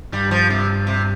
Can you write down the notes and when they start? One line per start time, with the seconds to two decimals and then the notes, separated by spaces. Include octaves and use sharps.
0.13 G2 G3
0.31 F3
0.50 C3
0.87 C3